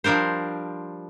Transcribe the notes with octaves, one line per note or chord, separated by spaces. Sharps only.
F3 G3 D4 A#4 C5